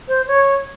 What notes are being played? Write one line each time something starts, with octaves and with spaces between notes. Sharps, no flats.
C5
C#5